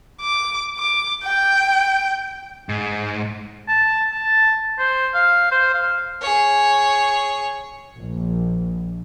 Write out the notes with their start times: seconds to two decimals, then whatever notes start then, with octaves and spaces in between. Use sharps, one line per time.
0.21 D6
0.79 D6
1.23 G5
2.69 G#2
3.68 A5
4.11 A5
4.79 C5
5.14 F5
5.51 C5
5.74 F5
6.21 G#4 C#5
7.94 A#1